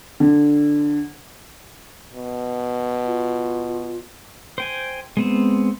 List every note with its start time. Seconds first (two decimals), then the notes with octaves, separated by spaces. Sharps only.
0.20 D3
2.14 B2
3.06 F4
4.58 C5 G5 G#5
5.17 G#3 B3 C4